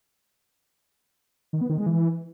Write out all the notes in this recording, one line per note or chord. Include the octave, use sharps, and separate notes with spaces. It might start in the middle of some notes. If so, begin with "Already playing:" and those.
D#3
B3
D#3
G#3
E3